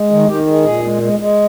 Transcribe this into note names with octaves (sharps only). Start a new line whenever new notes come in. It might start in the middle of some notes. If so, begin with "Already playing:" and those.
Already playing: G#3
D#3
D#3 G4
G#3
A#2 G#4
G#3
G#3
G#3